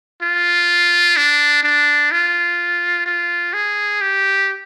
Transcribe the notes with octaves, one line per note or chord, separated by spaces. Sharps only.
F4
D4
D4
F4
F4
G#4
G4